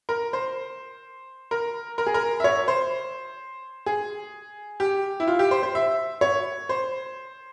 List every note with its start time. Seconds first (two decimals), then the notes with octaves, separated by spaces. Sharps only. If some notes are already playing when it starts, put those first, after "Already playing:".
0.09 A#4
0.33 C5
1.51 A#4
1.98 A#4
2.07 G#4
2.14 A#4
2.40 E5
2.44 C#5
2.68 C5
3.86 G#4
4.80 G4
5.20 E4
5.28 F4
5.39 G4
5.51 C5
5.63 C5
5.75 E5
6.21 C#5
6.69 C5